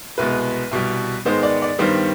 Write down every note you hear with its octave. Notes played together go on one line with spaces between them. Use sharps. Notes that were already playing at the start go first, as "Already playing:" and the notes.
C2 B2 G#3 B3 B4
C2 B2 G3
G#2 D#3 G#3 B3 C5
D5
D5
G2 D#3 G3 B3 C5